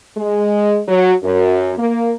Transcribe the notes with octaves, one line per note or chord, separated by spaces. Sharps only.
G#3
F#3
F#2
A#3